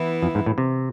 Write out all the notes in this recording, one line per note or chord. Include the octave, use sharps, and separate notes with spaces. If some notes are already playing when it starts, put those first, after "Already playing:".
Already playing: E3 B3 E4
F2
G#2
A2
C3